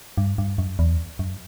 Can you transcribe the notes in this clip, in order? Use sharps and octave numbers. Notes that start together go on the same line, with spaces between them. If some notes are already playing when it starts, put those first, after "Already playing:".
G2
G2
F#2
E2
F#2